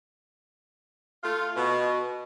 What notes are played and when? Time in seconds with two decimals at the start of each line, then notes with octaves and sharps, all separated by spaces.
1.24 A3 F4
1.56 B2